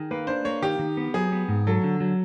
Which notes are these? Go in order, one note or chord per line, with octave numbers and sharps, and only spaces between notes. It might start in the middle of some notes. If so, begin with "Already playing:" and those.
Already playing: D#3 G#4
A#3 B4
D4 C5
A#3 C#5
D#3 G4
D#3
B3
F#3 G#4
B3
G#2
F#3 A4
D3
F#3